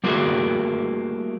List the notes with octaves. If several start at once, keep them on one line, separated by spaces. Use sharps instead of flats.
G3 A3 A#3 E4 F#4 G#4